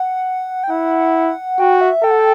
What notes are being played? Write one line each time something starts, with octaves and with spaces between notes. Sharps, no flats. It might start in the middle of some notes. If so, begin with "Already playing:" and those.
Already playing: F#5
G5
E4 F#5
F#4 G5
E5
A4 G5
F#5
G5